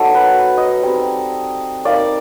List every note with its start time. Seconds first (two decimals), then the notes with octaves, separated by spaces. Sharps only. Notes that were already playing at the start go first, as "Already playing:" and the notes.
Already playing: F#3 B3 D#4 A4
0.15 B4
0.58 D#5
0.83 G3 C4 D#4
1.85 A#3 D#4 D5